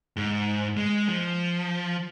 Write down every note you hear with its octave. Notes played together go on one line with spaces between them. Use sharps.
G#2
G#3
F3